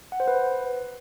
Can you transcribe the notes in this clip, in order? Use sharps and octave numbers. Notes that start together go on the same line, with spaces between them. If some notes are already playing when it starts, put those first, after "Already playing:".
F#5
C5
B4